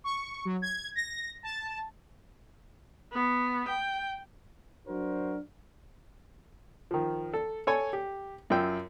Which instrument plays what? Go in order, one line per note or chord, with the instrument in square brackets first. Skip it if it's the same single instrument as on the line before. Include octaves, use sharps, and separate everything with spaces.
[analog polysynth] C#6
F#3
G#6
A#6
A5
[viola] B3
G5
[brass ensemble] F#3 D4 F#4 A#4 C5
[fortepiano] D#3 F3
A4
A4 C#5 G#5
G4
F#2 F4 G5 E6